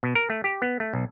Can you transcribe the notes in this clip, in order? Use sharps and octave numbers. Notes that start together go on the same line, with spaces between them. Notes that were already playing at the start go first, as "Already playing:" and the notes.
B2
A#4
A3
G4
B3
A3
B1